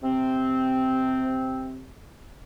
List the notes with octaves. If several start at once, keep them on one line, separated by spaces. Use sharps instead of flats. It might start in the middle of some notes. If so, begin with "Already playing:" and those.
C3 C4